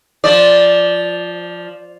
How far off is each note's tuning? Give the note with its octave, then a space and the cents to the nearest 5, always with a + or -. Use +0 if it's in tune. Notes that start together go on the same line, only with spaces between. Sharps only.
F3 +0 D5 +0